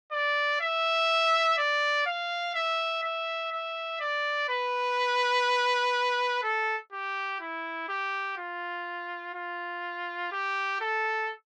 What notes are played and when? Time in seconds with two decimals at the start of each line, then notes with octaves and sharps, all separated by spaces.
0.12 D5
0.60 E5
1.58 D5
2.06 F5
2.55 E5
3.03 E5
3.52 E5
4.00 D5
4.49 B4
6.43 A4
6.92 G4
7.41 E4
7.88 G4
8.38 F4
9.34 F4
10.32 G4
10.81 A4